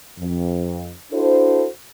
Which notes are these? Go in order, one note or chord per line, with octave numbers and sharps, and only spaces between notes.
F2
D4 E4 F#4 A4 C5